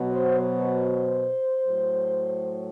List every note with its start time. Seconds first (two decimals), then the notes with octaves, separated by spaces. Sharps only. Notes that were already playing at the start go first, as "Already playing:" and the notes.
Already playing: B2 F#3
0.09 C5
0.40 C5
1.66 A2 F#3